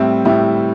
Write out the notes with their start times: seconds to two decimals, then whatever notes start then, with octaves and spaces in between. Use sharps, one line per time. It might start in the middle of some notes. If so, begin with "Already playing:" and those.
Already playing: A2 G3 C4 E4
0.25 A2 G3 C4 E4